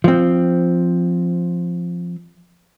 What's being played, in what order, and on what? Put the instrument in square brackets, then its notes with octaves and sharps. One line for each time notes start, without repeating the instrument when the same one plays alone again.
[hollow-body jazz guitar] F3 C4